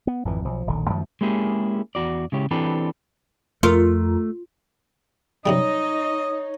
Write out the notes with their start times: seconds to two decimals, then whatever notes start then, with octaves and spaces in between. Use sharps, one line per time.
0.07 B3
0.25 G#1 F2 E3
0.45 B1 F3
0.67 D1 A#1 D3 D#3
0.90 F#2 D#3 F3 A3
1.21 G#3 A#3 C#4 E4 G4 G#4
1.95 E2 F#4 D5
2.32 C#3 G#3 E4 G4 C#5
2.51 E3 C4 D4 G4 A4 B4
3.63 F2 A3 F4 A#4
5.46 F#2 C3 G3 D#4 C#5 D#5